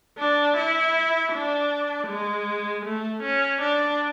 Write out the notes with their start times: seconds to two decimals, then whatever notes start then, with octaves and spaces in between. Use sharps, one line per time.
0.19 D4
0.57 E4
1.32 D4
2.08 G#3
2.85 A3
3.23 C#4
3.61 D4